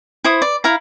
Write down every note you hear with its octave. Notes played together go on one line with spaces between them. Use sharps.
E4 C5 D#6
D5
E4 F5 A#5